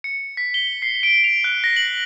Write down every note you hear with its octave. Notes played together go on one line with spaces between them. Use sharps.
C#7
B6
G7
C7
D7
F7
F#6
A#6
F#7